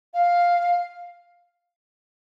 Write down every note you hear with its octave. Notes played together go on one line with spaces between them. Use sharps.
F5